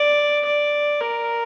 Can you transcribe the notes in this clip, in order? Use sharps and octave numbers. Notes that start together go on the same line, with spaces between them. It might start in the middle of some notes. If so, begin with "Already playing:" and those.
Already playing: D5
D5
A#4